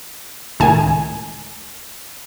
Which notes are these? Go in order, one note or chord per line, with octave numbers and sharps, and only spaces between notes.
C#2 A2 D#3 G#5